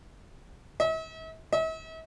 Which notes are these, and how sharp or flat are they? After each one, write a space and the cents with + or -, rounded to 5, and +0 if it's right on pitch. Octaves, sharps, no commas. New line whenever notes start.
E5 -45
E5 -45